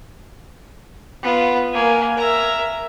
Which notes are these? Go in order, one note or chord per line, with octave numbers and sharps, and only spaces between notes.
B3 F4
A#3 A#4 G#5
A#4 E5 A#5